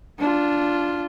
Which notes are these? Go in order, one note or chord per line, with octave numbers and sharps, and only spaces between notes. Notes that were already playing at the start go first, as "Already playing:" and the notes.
D4 F4